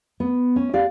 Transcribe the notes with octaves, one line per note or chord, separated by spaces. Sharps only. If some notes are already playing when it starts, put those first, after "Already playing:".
B3
C#4
G4 D5 F5